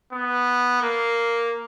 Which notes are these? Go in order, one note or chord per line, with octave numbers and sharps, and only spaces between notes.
B3
A#3